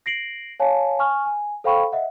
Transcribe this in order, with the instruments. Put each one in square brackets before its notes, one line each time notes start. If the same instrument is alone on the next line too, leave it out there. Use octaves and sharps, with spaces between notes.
[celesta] A#6 C7 D7 F#7
C#5 F5 G#5 A5
G#5 C#6 F6
G#5
A4 C5 F5 G5 B5 C#6
D#5 E5 F#5